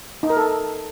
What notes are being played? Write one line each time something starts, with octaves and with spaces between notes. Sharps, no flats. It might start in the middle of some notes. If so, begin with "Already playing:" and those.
D#4
A#4
A4